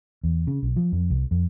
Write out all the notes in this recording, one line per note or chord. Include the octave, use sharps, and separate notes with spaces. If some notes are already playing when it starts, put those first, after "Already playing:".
E2
C#3
B1
F3
F2
C2
F2